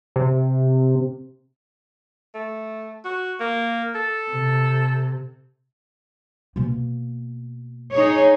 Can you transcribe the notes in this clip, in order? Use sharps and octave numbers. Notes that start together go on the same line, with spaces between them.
C3
A3
F#4
A#3
A4
C3
B2 A#3
D#4 G#4 C#5